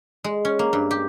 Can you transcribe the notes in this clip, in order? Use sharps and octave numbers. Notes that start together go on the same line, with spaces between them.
G#3
C#4
A#3
G2
G4